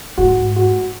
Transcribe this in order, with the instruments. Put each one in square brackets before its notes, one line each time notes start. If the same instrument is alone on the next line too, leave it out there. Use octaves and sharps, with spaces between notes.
[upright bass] G#2 [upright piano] F#4
[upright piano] F#4